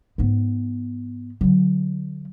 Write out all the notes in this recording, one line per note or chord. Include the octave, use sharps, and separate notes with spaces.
G#2 B3
D3 F#3